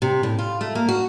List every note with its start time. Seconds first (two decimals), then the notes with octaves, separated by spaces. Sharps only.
0.02 C3
0.23 A2
0.39 F4
0.61 A3
0.75 A#3
0.89 F#4